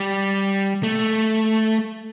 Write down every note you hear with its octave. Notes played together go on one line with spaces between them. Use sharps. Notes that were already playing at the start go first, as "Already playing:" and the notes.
Already playing: G3
A3